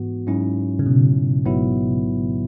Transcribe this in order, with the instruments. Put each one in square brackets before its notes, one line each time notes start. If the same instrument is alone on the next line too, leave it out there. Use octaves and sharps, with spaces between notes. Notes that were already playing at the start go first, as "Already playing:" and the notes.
Already playing: [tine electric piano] G#2 E3 B3 F#4
G#2 F#3 C#4 E4
[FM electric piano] C#3
B2
[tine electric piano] A1 G#2 F#3 B3 E4